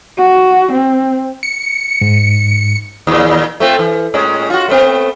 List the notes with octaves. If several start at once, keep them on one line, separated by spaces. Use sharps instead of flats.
F#4
C4
C#7
G#2
D#2 A#2
A3 C4 F4
E3
A2 G#3 C#4
F4 F#4
A3 B3 C4